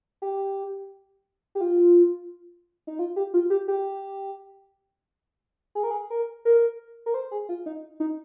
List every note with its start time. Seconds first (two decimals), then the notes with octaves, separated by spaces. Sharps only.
0.22 G4
1.55 G4
1.61 F4
2.87 D#4
2.99 F4
3.16 G4
3.34 F4
3.50 G4
3.68 G4
5.75 G#4
5.83 A#4
5.91 G#4
6.10 A#4
6.45 A#4
7.06 A#4
7.14 C5
7.31 G#4
7.49 F4
7.66 D#4
8.00 D#4